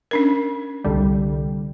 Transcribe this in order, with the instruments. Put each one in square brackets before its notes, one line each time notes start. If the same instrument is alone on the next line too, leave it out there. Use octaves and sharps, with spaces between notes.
[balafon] C#4 D4 A#4
[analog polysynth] C2 D3 G3